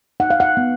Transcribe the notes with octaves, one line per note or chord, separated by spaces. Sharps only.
D#4 F#5
F5
F#5
B3